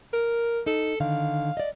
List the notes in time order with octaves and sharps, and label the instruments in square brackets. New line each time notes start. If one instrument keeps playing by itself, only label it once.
[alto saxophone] A#4
[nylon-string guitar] D#4 [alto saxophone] A4
[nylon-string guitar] D3 D#3 [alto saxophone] F5
[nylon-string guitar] D5 D#5